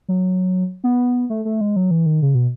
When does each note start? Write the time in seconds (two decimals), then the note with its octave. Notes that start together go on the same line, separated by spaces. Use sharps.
0.08 F#3
0.84 B3
1.30 A3
1.45 A3
1.61 G#3
1.76 F#3
1.91 E3
2.06 D#3
2.22 C#3
2.34 B2